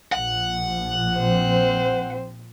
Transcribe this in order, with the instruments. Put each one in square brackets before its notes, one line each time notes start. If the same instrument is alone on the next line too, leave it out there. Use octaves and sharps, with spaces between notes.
[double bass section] A#1 F3 [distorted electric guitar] F#5
[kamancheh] C4 C5